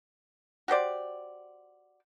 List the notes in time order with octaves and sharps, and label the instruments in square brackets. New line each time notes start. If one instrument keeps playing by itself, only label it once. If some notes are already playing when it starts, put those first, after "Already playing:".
[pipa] F#4 G4 C5 D5